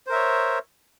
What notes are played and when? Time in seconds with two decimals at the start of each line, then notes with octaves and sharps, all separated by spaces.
0.06 C5
0.09 A#4
0.12 E5
0.15 C#5